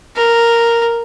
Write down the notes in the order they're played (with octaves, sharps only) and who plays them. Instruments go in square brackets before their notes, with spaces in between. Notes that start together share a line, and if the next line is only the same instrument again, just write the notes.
[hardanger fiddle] A#4